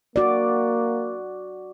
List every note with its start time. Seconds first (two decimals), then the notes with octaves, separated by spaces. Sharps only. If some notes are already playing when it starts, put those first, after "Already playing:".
0.16 A#3 F#4 D5